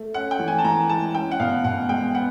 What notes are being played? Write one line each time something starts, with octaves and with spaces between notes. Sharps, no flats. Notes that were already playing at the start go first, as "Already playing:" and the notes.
Already playing: A3
C#4 F#5
G5
E3
G#5
A5
E3 A#5
G#3 A5
C#4 G5
F#5
B2 F5
B2 F#5
G#3 G5
B3 F#5